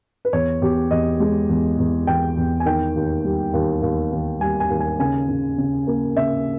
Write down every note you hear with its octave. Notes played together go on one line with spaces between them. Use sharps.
B4
E2 C#5
E2 G4
E2 D#5
G#3
E2
E2
E2 G5
E2
G#5
D#3 G5
D#2
G3
D#2
D#2
D#2
G3 G#5
G#5
D#2
G#5
C#3 G#5
C#3
C#3
A#3
C#3 E5